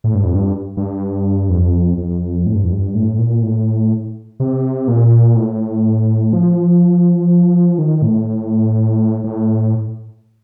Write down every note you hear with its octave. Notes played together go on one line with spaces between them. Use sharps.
A2
G2
F2
G2
G2
F2
F2
A2
G2
F2
G2
A2
A#2
A2
C3
A#2
A2
F3
D#3
A2
A2